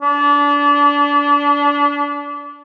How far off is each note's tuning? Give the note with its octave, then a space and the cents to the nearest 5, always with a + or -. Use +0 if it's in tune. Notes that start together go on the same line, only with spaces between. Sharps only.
D4 -30